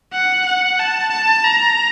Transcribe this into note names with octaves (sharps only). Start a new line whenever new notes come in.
F#5
F#5
A5
A5
A#5